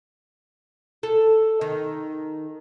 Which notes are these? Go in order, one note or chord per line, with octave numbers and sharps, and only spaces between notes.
A4
D#3